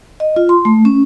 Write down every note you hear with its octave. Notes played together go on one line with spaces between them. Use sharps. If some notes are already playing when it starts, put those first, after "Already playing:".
D#5
F4
C6
A3
C#4